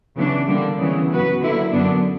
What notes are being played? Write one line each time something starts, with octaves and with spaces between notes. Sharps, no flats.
C#3 E3 B3 D4
D3 G3 A#3 D4
C#3 E3 B3
F#3 B3 F#4 B4
D3 F#3 A#3 E4
F#2 D3 F#3 B3 D4